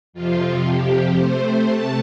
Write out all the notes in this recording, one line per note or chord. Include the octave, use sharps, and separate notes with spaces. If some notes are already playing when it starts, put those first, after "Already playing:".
F2 C3 F3 F4
G4
C3 A3 C5
A5